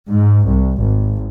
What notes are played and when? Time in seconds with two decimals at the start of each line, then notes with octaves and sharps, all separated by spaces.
0.11 G#2
0.48 C2
0.80 G#1